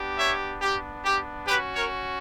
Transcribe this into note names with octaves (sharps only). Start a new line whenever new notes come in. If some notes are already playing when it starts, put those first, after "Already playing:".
Already playing: B3 D4 G4
C#5 E5
G4
G4
C#4 F#4 G4 B4
A#4 C#5